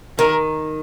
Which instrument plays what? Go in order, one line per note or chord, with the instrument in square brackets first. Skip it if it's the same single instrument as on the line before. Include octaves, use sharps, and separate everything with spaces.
[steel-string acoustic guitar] D#3 [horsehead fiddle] A#4